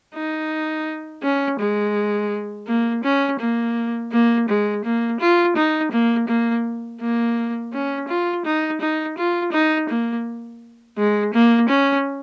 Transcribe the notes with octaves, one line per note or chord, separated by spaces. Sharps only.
D#4
C#4
G#3
A#3
C#4
A#3
A#3
G#3
A#3
F4
D#4
A#3
A#3
A#3
C#4
F4
D#4
D#4
F4
D#4
A#3
G#3
A#3
C#4